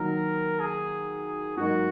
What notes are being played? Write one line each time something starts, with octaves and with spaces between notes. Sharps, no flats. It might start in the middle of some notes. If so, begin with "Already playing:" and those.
Already playing: D#3 F#3 A#3 A#4
G#4
G#2 F#3 A#3 D#4 F#4